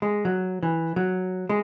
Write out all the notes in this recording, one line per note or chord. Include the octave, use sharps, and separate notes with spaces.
G#3
F#3
E3
F#3
G#3